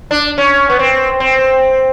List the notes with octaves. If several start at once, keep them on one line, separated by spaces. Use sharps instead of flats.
D4
C#4
B3
C4
C4